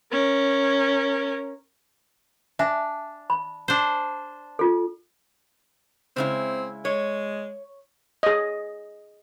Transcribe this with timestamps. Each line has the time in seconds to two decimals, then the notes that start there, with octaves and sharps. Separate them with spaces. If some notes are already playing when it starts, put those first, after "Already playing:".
0.12 C#4 A#4
2.59 D4 E5 G#5
3.30 B5
3.68 D4 C5
4.59 F4 A4
6.16 C#3 G#3 C4 E4
6.85 G#3 C#5
8.23 G#4 D#5